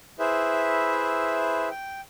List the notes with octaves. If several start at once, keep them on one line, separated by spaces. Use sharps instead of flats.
E4 G#4 B4 C5 E5
G5